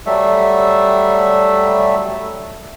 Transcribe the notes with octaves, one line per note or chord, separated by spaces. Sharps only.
F#3 G3 A3 E5